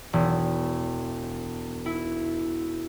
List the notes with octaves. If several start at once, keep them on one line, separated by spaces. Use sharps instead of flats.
E1
E4